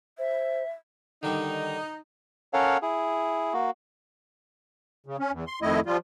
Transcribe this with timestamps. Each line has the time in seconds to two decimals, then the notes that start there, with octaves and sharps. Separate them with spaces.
0.18 C5 E5
1.23 D3 D#3 G3 D#4
2.53 C#4 A4 A#4 C#5 F5 F#5
2.82 E4 G#4
3.53 A#3 F#4
5.06 C#3
5.19 C#4
5.32 E2
5.47 C6
5.62 F2 D#3 A3 E4 D#5
5.86 F3 G3 F4